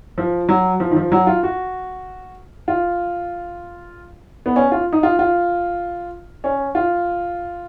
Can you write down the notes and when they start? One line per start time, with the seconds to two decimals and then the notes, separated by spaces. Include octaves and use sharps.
0.18 F3
0.49 F#3
0.80 F3
0.91 D#3
0.96 F3
1.12 F#3
1.27 F4
1.43 F#4
2.68 F4
4.46 B3
4.56 C#4
4.72 F4
4.93 D#4
5.03 F4
5.19 F4
6.44 C#4
6.75 F4